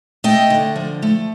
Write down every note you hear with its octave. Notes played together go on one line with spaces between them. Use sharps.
A3 D#5 G5
D3
F3
A3